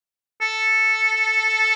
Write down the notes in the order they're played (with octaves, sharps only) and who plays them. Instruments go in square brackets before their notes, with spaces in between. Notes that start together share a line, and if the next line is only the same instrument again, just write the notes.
[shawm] A4